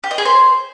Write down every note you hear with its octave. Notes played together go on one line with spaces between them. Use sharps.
G4
D#5
G#4
C5